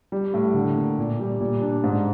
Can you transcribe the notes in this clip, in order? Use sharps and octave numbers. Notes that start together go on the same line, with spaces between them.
G3
A2
D3
A#3
A#2
G3
A#2
D4
G#2